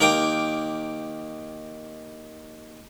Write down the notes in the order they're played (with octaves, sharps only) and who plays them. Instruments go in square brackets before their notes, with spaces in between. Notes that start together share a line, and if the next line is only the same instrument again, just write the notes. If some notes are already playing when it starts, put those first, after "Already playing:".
[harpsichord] D#2 A#4 G5 A#5 D6